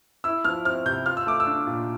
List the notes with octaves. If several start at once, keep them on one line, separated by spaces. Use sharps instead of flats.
E4 E6
F3 F6
C4 F6
C3 G6
F4 F6
E6
A3 D6
E6
D4
A#2